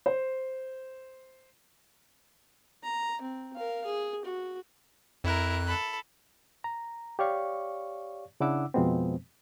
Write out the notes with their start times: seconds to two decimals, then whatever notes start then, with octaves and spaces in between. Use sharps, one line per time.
0.06 C5
2.83 A#5
3.21 C4
3.56 A#4 F5
3.85 G#4
4.25 F#4
5.24 F2 E4 A#4 F#6
5.67 A4 B5
6.64 A#5
7.19 G4 C#5 D5 F5 C#6
8.40 C#3 D4 E4 F#5 D6 E6
8.74 F2 B2 F3 G#3 B3 C4